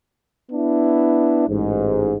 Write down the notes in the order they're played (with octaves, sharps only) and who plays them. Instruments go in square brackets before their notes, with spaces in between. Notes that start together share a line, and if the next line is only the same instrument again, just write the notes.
[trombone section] B3 D4 E4
A1 G#2